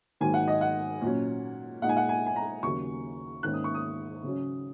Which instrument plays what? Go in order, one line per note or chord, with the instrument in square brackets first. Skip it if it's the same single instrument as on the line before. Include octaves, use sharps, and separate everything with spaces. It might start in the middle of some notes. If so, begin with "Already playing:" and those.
[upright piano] G#2 D#3 F#3 A#3 G#5
F#5
D#5
F#5
A#2 F#3 C#4
A#2 G#3 D#4 F#5
G#5
F#5
G#5
G#5
A#5
D#2 C#3 F#3 A#3 C#6
G#2 D#3 A#3 C#4 F#6
D#6
C#6
D#6
C#3 F#3 C#4